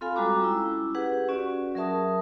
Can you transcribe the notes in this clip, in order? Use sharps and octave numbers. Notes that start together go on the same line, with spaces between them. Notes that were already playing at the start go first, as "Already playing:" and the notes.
C4 F4 A4 F5 G#5 B5
G3 G#3 F#4 A#5 D6
C#4 E4
G4 G#4 B4 F#5
C#4 F#4 D5
F#3 G#4 A#4 E5 A5 D#6